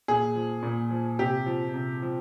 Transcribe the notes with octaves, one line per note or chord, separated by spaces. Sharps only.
A#2 G#4
F3
A#2
F3
C3 G4
F3
C3
F3